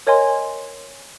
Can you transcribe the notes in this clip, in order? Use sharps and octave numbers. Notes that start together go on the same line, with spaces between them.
A#4 C#5 D#5 G#5 C6